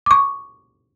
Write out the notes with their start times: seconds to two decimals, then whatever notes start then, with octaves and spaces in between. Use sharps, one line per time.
0.06 C#6 D6